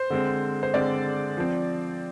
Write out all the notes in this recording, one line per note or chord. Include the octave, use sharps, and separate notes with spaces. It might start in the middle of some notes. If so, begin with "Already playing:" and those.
Already playing: C5
D3 G#3 C4
C5
D3 G#3 C4 D5
F3 C4